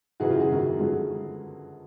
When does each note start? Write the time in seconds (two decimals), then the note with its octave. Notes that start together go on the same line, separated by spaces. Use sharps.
0.20 F#2 C#3 E3 F#4 G#4
0.30 F4 G4
0.40 F#4 G#4
0.50 F#2 D#3
0.79 G2 D3 F3 F#4 G#4